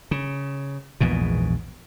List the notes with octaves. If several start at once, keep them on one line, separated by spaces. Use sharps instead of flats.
C#3
A#1 E2 G#2 B2